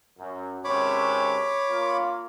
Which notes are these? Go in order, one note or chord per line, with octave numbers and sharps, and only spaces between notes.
F#2
G#1 C3 C#4 C#5 B5 D6
A#3 F4